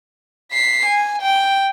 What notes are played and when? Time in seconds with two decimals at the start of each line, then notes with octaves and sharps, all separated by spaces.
0.52 B6 C7
0.86 G#5
1.22 G5